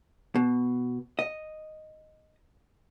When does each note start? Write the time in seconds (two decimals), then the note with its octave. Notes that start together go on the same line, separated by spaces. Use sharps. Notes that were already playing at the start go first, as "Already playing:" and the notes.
0.35 B2
1.19 D#5